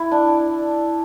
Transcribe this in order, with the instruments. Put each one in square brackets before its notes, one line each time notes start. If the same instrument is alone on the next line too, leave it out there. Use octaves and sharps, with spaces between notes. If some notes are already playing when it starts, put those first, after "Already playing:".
Already playing: [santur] E4
D4